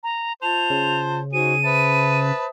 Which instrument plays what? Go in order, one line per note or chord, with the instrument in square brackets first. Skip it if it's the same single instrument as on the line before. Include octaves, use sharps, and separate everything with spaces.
[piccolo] A#5
[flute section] F4 A5 [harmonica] C5 [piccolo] F7
[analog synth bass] C#3
[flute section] D#4 F#4 C5 [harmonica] G#4 [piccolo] D#7
[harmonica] B4 A5 [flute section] C5 E5 D#6